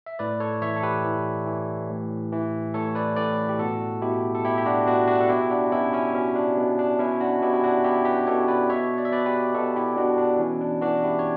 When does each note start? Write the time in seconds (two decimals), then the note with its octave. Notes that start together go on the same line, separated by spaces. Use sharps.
0.06 E5
0.19 A2 B4 D5
0.40 A4 C#5
0.62 E3 C#5 E5
0.76 A4
0.83 G4 B4
1.04 E3
1.46 E3
1.89 A2
2.33 E3
2.74 A2 A4 C#5
2.95 B4 D5
3.16 A2 B4 D5
3.49 G4
3.59 B2 F#4 A4
4.02 B2 E4 G4
4.35 A4
4.45 B2 E4 G4
4.58 G4
4.66 D4 F#4
4.87 B2 D4 F#4
5.08 D4 F#4
5.21 A4
5.29 B2 E4 G4
5.50 D4 F#4
5.71 B2 C#4 E4
5.93 C#4 E4
6.14 B2 C#4
6.35 D4
6.58 B2
6.79 D4
6.99 B2 C#4 E4
7.21 D4 F#4
7.41 B2 E4 G4
7.53 E4
7.64 D4 F#4
7.84 B2 E4 G4
8.05 G4 B4
8.27 B2 A4 C#5
8.48 B4 D5
8.69 B2 C#5 E5
8.98 D5
9.05 E5
9.12 B2 B4 D5
9.26 G4 B4
9.54 B2 F#4 A4
9.76 E4 G4
9.96 B2 D4 F#4
10.18 D4
10.39 E3 C#4
10.61 D4
10.81 E3 D4 F#4
11.04 E4 G4
11.19 C#5